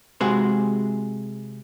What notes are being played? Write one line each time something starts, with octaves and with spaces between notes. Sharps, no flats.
C3 G#3 F#4 G#4 C5